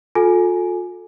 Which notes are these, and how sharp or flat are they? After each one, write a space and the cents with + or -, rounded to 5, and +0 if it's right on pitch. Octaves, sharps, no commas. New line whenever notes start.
F4 +40 A4 -5 G#5 +15